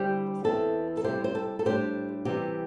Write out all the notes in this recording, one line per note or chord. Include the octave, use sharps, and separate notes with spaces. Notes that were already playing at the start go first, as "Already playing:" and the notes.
Already playing: D3 G3 C4 E4 G4 C5
E2 E3 C4 E4 A4
A4
C3 G3 E4 G4 C5
C5
A4
A4
A2 G3 D4 G4 C5
C3 E3 G3 G4